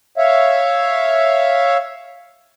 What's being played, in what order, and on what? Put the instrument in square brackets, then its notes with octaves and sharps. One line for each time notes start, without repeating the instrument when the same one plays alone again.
[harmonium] C#5 E5 F5